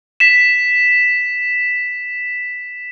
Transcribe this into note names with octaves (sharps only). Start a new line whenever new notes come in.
B6 E7